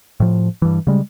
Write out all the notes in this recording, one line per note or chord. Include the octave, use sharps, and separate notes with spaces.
A2 F3
G2 E3
C#3 G3 G#3